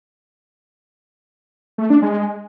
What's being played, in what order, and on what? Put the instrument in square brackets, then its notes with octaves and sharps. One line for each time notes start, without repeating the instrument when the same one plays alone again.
[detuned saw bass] A3
D4
G#3